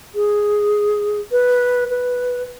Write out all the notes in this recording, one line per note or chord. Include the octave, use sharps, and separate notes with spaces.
G#4
B4
B4